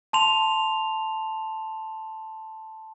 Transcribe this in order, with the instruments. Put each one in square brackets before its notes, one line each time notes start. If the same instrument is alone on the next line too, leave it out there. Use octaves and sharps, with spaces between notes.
[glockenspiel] A5 C6 F7